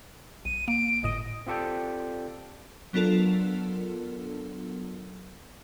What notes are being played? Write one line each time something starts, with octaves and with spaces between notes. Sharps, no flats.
B1 D#7
A#3 D7
G1 A2 D#5 D#7
C4 F4 G4 A4 D5 G5
F#3 B3 D4 F4 A4 A#4